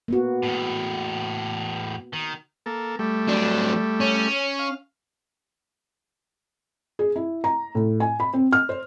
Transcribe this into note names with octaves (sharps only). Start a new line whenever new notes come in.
A#3 B3 F#4
E2 A2
D#3
A#3 A4
G3 A3
F#3 D4
C#4
F5
G#4
E4
A#5
A2
G#5
B5
C4
F6
C5